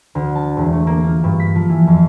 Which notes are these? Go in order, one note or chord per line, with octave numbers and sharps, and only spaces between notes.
D2
A5
E1
A3
A#3
F4
G2
B6
F3
E3
F2